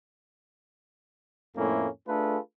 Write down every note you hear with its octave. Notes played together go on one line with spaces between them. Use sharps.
F2 A2 A3 A#3 C#4 E4
A3 D4 F4 G#4 A4 B4